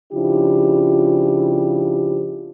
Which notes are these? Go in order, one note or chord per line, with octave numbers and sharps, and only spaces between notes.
C#3 F3 D4 E4 F4 G4